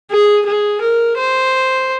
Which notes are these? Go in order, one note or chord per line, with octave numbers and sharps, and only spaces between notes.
G#4
G#4
A#4
C5